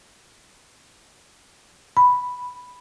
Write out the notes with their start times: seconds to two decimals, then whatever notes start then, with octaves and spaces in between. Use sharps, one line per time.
1.97 B5